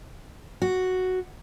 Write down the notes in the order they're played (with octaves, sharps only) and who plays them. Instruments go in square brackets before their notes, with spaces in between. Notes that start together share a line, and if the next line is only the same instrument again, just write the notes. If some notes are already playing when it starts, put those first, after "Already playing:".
[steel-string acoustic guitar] F#4